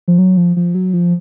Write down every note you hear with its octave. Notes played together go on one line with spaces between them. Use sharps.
F3
F#3
F3
F3
F#3
F3